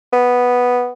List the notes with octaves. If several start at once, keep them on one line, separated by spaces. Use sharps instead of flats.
B3